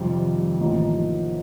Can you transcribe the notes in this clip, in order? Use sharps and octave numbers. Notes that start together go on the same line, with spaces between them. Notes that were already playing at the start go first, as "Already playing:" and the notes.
Already playing: F2 C3 D#3 G3 C4
A1 A2 F3 A#3 D#4